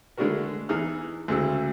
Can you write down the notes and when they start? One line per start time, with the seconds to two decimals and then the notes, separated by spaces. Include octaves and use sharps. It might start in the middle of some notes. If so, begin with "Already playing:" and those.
0.17 D3 G#3 A3 D4 F#4 A#4
0.69 E2 E3 D#4 G#4 F6
1.28 D2 C#3 G#3 E6